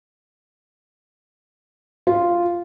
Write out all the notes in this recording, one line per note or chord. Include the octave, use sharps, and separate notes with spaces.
F4